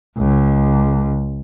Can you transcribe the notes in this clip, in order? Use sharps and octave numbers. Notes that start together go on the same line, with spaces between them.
C#2